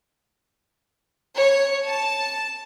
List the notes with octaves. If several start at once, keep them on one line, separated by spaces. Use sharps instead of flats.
C#5
A5